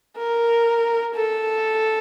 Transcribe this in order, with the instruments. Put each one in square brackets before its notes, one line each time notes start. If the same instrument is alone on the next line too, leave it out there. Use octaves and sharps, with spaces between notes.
[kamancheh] A#4
A4